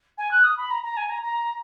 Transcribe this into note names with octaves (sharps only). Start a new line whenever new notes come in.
G#5
F#6
D#6
B5
A#5
A#5
G#5
A#5
A#5